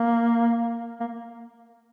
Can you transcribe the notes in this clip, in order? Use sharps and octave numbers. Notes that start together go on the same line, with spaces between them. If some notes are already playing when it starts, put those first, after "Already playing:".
Already playing: A#3
A#3